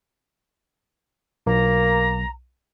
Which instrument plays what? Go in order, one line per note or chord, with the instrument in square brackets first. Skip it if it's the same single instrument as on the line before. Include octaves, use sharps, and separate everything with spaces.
[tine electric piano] B1 [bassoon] A#3 [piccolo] A#5